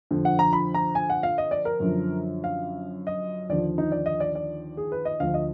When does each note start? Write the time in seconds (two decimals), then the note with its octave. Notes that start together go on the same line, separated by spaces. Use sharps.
0.11 F2 D3 F3
0.25 F#5
0.39 A#5
0.53 B5
0.74 A#5
0.95 G#5
1.10 F#5
1.23 F5
1.38 D#5
1.51 D5
1.65 A#4
1.80 F#2 D3 F3
2.44 F5
3.07 D#5
3.49 D#2 D3 F3 D5
3.78 D#4
3.92 D5
4.06 D#5
4.20 D5
4.35 D5
4.77 G#4
4.92 B4
5.05 D#5
5.20 D2 D3 F3 F5
5.34 D#5